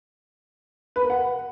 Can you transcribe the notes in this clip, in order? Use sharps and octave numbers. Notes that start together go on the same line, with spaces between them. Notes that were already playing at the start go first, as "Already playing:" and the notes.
B4
A#4
F#5